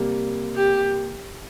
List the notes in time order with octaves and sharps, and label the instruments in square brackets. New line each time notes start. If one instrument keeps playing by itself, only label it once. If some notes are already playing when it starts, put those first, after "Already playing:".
Already playing: [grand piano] C3 G3 A#3
[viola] G4